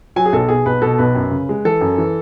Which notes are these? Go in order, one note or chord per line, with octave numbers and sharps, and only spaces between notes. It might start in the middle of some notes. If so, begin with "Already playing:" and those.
F#3 G#5
G#4
B1 A4
B2 G#4
B1 B4
B2 A4
B1 B4
F#2
C#3
G#3
E3 A4
F#2
E3